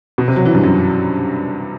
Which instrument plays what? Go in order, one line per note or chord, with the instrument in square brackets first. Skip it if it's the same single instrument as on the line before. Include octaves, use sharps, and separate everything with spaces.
[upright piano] B2
C3
F#3
E3
G2
F#2